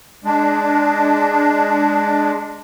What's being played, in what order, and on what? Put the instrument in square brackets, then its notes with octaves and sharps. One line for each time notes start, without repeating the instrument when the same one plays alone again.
[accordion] G#3 D4